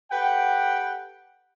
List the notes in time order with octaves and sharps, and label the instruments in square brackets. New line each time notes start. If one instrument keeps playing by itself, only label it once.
[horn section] G4 A4 B4 F#5 G5